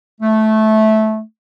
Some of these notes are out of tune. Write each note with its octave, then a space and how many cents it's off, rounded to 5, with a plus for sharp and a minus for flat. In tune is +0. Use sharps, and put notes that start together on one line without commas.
A3 -15